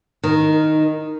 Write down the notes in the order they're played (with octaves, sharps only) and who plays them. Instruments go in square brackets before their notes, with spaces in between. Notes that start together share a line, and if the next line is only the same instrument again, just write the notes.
[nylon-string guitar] D#3